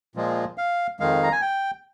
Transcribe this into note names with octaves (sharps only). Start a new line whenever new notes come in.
A#2 F3 G#3
F5
F2 D#3 G#3 F5
A#5
G#5
G5